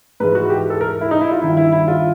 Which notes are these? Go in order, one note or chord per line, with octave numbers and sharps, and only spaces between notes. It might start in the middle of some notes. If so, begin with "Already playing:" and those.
G#2 E3 B4
F#4
G4
A4
A#4
E4
D#4
E4
F4
G2 D#3 E4
E4
E4
F4